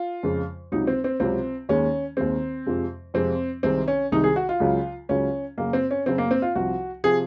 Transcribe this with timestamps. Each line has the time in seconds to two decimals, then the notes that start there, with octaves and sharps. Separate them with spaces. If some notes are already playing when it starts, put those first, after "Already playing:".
Already playing: F4
0.23 F2 C#3 G#3
0.72 C#2 C3 F#3 D#4
0.87 C4
1.04 C4
1.20 C#2 C3 F#3 C4
1.69 D#2 D#3 G#3 C#4
2.17 D#2 D#3 G#3 C4
2.66 F2 C3 F3 G#3
3.14 F2 C3 F3 G#3 C4
3.63 C2 C3 D#3 G#3 C4
3.88 C#4
4.12 C2 C3 D#3 G#3 D#4
4.24 G#4
4.36 F#4
4.49 F4
4.60 C#2 C#3 F#3
5.09 C#2 C#3 F#3 C#4
5.58 F#2 C#3 F#3 A#3
5.73 C4
5.91 C#4
6.06 F#2 C#3 F#3 C4
6.18 A#3
6.31 C4
6.42 F4
6.55 C2 C3 F3 F#4
7.04 C3 F3 G#4